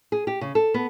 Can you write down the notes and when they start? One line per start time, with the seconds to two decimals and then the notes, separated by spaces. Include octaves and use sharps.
0.12 G#4
0.27 G4
0.41 C#3
0.55 A4
0.74 B3